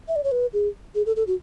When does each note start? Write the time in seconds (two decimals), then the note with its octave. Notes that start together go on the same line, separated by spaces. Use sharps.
0.08 E5
0.16 D5
0.24 C#5
0.32 B4
0.53 G#4
0.95 G#4
1.06 A4
1.16 A4
1.27 F#4